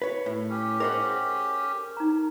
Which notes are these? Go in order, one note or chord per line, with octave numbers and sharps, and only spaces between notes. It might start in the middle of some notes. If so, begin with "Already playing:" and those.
B4 C#5
A2
C#4 G4
G#4 A#4 C5 D#5 F#5 D6
A4
D#4 A#5